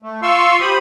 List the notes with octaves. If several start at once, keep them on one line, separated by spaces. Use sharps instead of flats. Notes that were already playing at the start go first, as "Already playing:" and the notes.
A3
F4 F5 C6 C#6 E6
G4 C5 B5 D#6